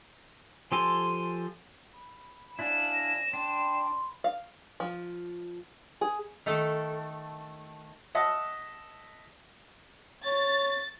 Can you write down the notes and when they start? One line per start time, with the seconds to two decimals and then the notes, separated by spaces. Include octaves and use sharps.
0.72 F3 G4 A4 G#5 C6
1.94 B5
2.59 D4 E4 D5 F5 G#5 E7
2.92 A#6
3.33 D4 G5 B5 C6
4.24 F5
4.80 F3
6.01 G#4
6.46 D#3 A3 A4
8.15 D#5 E5 F#5 A5
10.26 C#5 A6